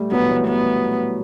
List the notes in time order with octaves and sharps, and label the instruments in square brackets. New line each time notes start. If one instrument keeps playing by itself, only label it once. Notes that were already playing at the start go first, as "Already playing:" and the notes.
Already playing: [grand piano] G3 A3
[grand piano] F#3 [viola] B3
[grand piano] E3
F#3
[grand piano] A3 [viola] B3